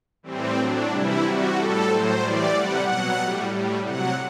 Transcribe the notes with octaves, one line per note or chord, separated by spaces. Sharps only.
A2 E3 G3 C4
A2 F#3 D4
C3 E3 G3 E4
C3 G3 F#4
A2 G3 A4
A2 F#3 C5
A2 E3 G3 D5
C3 G3 F#5
B2 F#3 F#5
A2 G3
A2 G3
C3 F#3 F#5